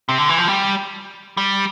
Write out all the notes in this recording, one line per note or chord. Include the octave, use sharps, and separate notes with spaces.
C3
D3
E3
F3
G3
G3